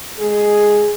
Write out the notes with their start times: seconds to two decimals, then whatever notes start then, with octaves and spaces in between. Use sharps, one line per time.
0.19 G#3 G#4